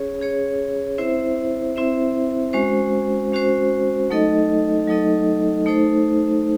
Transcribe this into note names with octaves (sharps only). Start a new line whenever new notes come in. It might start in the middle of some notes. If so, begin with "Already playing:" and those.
Already playing: C#4 G#4 C#5
C#4 G#4 C#5
C4 E4 C5 E5
C4 E4 C5 E5
G#3 C#4 F#4 C5
G#3 C#4 F#4 C5
F#3 A3 D#4 A4 D#5
F#3 A3 D#4 A4 D#5
A3 D#4 A4 C5